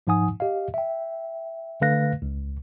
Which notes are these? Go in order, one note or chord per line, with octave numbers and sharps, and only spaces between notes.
G#2 F3 D#4 F#5 G#5 D#6
G4 D#5 F5
E5 G5
D3 A3 B4 F5 F#6 A#6
C#2